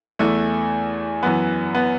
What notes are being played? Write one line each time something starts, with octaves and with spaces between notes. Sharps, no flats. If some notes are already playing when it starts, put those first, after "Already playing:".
E2 E3 A3
F#2 E3 B3
B3